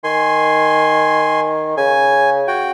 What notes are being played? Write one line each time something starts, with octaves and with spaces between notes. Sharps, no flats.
D#3 G#5 C6
C#3 G#5
F#4 G5